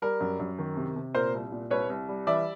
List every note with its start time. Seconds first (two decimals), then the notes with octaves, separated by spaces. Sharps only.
0.02 G3 A#4
0.21 F#2
0.40 F#2
0.59 D#3
0.77 C3
0.96 C3
1.14 A#2 A#4 C5
1.34 C2
1.52 A#2
1.71 C2 B4 C#5
1.90 C2
2.09 G3
2.27 E3 D5 E5